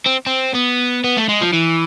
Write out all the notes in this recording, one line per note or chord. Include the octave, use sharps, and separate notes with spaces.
C4
C4
B3
B3
A3
G#3
F3
E3